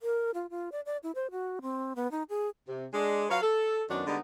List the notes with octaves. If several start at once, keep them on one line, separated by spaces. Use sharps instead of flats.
A#4
F4
F4
D5
D5
E4
C5
F#4
C4
B3
D#4
G#4
C3
G#3 D4
F#3 B4 C#5 F5
A4
F#2 D#3 F#3 B3 D4
D3 G3 G#3 B3 D#4